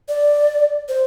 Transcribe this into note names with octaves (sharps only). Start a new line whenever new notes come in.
D5
C5